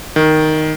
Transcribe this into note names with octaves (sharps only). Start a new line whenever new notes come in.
D#3